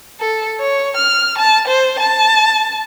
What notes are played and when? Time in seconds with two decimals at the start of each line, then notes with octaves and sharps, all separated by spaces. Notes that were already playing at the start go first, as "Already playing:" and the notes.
0.20 A4
0.60 C#5
0.97 F6
1.38 A5
1.68 C5
2.00 A5